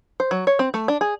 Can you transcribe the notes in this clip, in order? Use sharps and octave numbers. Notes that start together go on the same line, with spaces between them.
C5
F#3
C#5
C4
A3
D4
G#4